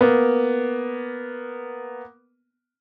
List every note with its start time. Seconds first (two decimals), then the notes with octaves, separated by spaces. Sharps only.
0.01 A#3 B3